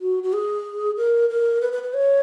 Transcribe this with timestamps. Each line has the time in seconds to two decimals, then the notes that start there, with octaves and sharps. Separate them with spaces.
0.01 F#4
0.23 F#4
0.33 G#4
0.97 A#4
1.30 A#4
1.61 B4
1.72 B4
1.83 B4
1.94 C#5